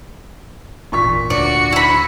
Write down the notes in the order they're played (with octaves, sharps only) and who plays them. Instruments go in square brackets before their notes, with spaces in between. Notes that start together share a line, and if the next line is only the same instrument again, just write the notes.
[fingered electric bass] G#1 E2 [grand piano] A#2 C#6 B6
[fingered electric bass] D2 G#2 D3 [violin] F#4 C#7 [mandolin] D5
[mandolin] E4 B5